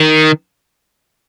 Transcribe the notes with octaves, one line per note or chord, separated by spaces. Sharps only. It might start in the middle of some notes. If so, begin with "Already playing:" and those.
Already playing: D#3